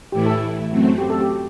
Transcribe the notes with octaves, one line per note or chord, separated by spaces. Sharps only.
A2 E3 A3 E4 G4
A4
F#2 F#3 A3 C4
G4
A4
G4